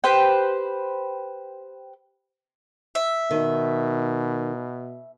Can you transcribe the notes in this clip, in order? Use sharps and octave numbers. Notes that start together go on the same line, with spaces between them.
G4 B4 C5 G5
E5
B2 D#3